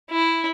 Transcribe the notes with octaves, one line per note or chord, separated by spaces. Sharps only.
E4